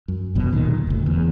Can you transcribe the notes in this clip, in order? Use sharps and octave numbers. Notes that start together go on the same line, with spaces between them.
F#2
F1 D#2 B2 F#3
D2 A#2 D#3
F1 D2
E2